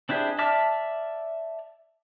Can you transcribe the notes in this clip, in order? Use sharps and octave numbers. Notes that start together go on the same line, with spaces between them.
C4 D4 E4 G4 G#4
D5 E5 A5 D6 F6